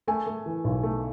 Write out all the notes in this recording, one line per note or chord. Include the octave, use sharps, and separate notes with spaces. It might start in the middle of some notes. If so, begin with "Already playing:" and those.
A3 G#5
A3
E3
B1
A3